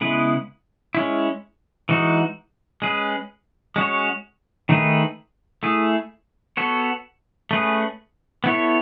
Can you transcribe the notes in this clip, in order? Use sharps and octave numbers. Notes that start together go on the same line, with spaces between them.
C#3 G#3 B3 E4 B4
G#3 C#4 E4
E3 G#3 D#4 F#4
G#3 C#4 G#4 B4
G#3 C#4 F#4 C#5
D#3 A3 D#4 G#4 B4
A3 E4 G#4
B3 F#4 A4 C#5
A3 C#4 G#4 B4
B3 E4 A4 C#5